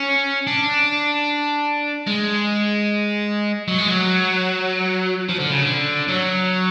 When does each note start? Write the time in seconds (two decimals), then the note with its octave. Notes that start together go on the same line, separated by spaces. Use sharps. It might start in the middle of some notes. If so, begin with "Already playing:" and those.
Already playing: C#4
0.47 D4
2.07 G#3
3.68 F#3
3.78 G#3
3.89 F#3
5.29 F3
5.39 D3
5.51 C#3
5.62 D3
6.08 F#3